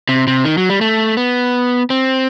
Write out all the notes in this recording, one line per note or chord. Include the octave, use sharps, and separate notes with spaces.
C3
C3
D#3
F#3
G3
A3
B3
C4